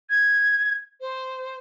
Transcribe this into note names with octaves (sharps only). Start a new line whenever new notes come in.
G#6
C5